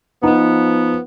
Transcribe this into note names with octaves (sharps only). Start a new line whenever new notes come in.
F3 B3 D#4